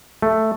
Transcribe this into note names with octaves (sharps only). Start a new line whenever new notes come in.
A3